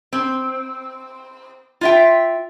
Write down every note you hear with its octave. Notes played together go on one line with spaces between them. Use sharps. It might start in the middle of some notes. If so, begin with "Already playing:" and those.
C4
F4 E5 G5